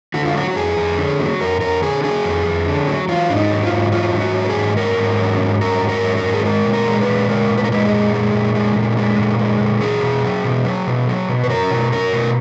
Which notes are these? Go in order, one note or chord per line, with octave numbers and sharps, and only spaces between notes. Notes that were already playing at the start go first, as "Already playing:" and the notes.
D3 F#4
F4
F#3 F#4
F#4
F2 G#4
F2
D3
F#3
F2 A#4
F2 A#4
D3 G#4
F#3 G#4
F2
F2
D3
F#3
F#3 F4
G#2 D4
D#4
F#3
F4
G#2
F#3 F4
G#2
F#4
F#3
A#4
G#4
G#2
F#3 A#4
G#2
F#3
G#2
F#3 A#4
G#2
A#4
F#3
A#4
G#2
G#4
G#3 A#4
A#2
A#4
G#3
B4
A#2
G#3 A#4
A#2
B4
A#4
G#3 B4
G#4
A#2
G#3
A#2
G#3
A#2
G#3
A#2
G#3
A#2
F#3 G#4
B2
F#3
B2
F#3
B2
F#3
B2
B4
F#3 A#4
B2
F#3 A#4
B2